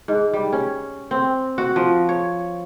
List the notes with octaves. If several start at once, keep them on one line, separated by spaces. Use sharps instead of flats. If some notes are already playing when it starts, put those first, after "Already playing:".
G#2
G3
C#4
C4
F#4
F3
C#5